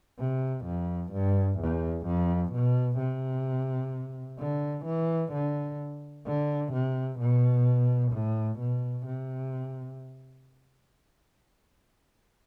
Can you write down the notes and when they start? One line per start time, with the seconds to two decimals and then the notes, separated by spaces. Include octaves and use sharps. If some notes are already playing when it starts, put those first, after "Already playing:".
0.19 C3
0.66 F2
1.12 G2
1.59 E2
2.06 F2
2.53 B2
2.99 C3
4.39 D3
4.86 E3
5.33 D3
6.26 D3
6.73 C3
7.19 B2
8.13 A2
8.60 B2
9.06 C3